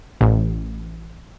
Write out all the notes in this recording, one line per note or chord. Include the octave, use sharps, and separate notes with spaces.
A1